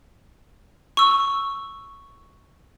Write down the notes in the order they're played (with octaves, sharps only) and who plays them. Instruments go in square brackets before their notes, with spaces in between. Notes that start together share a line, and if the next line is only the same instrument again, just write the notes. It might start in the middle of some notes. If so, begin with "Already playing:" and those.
[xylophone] C#6 E6